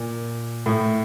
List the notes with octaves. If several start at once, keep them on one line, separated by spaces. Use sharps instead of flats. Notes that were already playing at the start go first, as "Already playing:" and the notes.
Already playing: A#2
A2